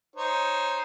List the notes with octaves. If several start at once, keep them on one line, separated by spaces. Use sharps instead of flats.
D#4 C5 C#5